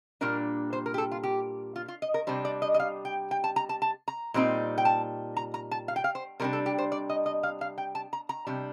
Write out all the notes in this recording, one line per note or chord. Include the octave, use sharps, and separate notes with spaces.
A#2 G3 A#3 D4 A#4
C5
A#4
G4
A4
F4
G4
F4
F4
D#5
A#4
C3 G3 D4 C5
D5
D#5
D#5
F5
G5
G5
A5
A#5
A5
A5
A#5
A#2 G3 C4 D#4
G5
A5
A#5
A#5
A5
F5
G5
F5
C5
C3 G3 D4 A#4
A4
G4
C5
D5
D#5
D#5
F5
F5
G5
A5
A#5
A#5
C3 G3 D4